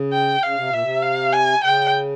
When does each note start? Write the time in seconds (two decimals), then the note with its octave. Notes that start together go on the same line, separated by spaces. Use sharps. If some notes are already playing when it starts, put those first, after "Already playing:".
Already playing: C#3
0.13 G5
0.43 C#3 F5
0.56 C3
0.69 A#2 E5
0.82 C3
1.02 F5
1.33 G#5
1.64 C#3 G5